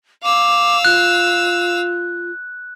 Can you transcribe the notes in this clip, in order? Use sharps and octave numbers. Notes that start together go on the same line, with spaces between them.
F5 D6 E6
F4 F#6